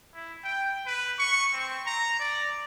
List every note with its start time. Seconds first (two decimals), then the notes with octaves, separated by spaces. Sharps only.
0.14 E4
0.44 G5
0.86 B4
1.19 C#6
1.53 C4
1.86 A#5
2.19 D5